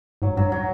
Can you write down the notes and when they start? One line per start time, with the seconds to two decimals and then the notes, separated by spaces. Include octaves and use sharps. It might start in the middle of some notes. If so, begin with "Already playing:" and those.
0.22 G#2 F#3
0.37 G2 F#3
0.52 F#3